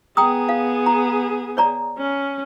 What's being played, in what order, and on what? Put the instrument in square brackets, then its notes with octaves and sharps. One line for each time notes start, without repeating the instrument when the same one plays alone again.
[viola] B3 G#4 [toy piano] G5 A#5 D#6
[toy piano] F5
A#5
C#5 D5 A#5
[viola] C#4